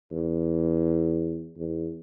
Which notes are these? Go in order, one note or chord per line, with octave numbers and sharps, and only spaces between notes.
E2
E2